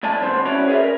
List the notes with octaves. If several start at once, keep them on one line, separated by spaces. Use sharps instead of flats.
A2 D5 G#5 A5
D3 G3 B3 C4 C5
C#4 E4 F#4 C#5 D5
G#4 B4 D5 E5
A#4